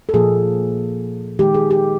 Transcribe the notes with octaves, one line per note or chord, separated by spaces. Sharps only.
A4
A#2 F3 A#3 G#4
D#3 G#3 G4
G#4
G4